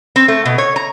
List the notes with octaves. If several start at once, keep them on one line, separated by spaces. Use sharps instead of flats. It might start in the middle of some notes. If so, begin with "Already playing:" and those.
C4
A3
B2
C#5
A#5